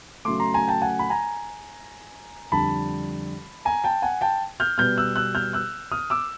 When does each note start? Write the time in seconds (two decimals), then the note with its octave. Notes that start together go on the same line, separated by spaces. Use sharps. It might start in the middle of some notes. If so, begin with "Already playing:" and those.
0.25 C#3 F#3 A3 C6 D6
0.40 A#5 C6
0.54 G#5 A#5
0.68 G5 A5
0.82 F#5 G#5
0.99 B5
1.10 G#5 A#5
2.52 F2 D3 G3 A5 B5
3.65 G#5 A#5
3.84 G5 A5
4.02 F#5 G#5
4.21 G5 A5
4.60 F6 G6
4.78 B2 G3 B3 F6 G6
4.97 E6 F#6
5.16 E6 F#6
5.35 F6 G6
5.53 E6 F#6
5.92 D#6 F6
6.10 D6 E6